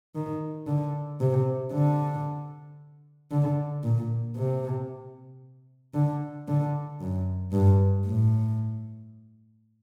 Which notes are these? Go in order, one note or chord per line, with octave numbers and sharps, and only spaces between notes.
D#3
D3
C3
D3
D3
A#2
C3
D3
D3
F#2
G2
A2